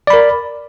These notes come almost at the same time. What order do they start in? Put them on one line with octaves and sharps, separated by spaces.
D5 B5 A#4